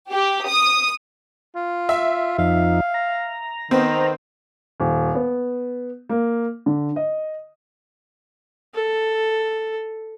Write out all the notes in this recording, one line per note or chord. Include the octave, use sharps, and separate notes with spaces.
G4
D#6
F4
E5
F2 F3 D#4 F5
A#5
D#3 B3 C4
D#1
B3
A#3
D3
D#5
A4